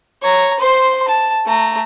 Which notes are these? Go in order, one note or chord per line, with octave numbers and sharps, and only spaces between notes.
C#5 A#5
C5 C6
A5
A3 A#5